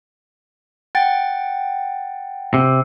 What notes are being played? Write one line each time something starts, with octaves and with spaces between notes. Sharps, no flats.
F#5 G5 A6
C3